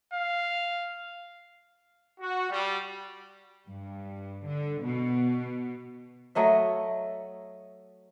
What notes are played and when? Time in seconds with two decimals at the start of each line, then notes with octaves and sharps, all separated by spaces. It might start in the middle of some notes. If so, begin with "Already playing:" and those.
0.13 F5
2.21 F#4
2.50 G3
3.67 G2
4.46 D3
4.84 B2
6.35 F#3 A3 D#5 E5